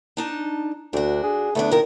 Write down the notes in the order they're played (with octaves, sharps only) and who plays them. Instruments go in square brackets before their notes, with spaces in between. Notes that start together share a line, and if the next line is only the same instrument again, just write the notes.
[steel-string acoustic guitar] D4 D#4 A5
[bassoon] D2 [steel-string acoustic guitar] D4 F#4
[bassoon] G#4
[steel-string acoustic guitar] D2 B3 D4 [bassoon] A3
[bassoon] A#2 [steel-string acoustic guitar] D#3 A#4